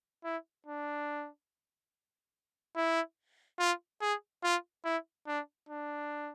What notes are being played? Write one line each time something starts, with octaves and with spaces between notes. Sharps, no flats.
E4
D4
E4
F4
G#4
F4
E4
D4
D4